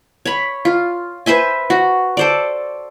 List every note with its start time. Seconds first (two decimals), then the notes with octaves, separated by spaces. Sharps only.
0.25 C#5 B5
0.65 F4
1.26 B4 C5 E5 G#5
1.70 F#4
2.17 A4 C5 D5